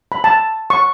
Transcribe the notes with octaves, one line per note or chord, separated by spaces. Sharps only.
B5
A5
C#6